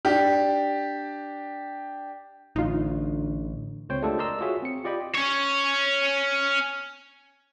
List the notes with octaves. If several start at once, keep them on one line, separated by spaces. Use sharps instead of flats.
D4 G4
A1 D3 D#4 F4
C#2 C4 C5 C#5 G5
G#3 A3 D4 F4 G4 A4
A#4 D5 D#5 A#5 C6 E6
F4 F#4 G#4 C#5 E5
C4 C#7
F4 G4 D5 D#5 G5 B5
C#4 C#5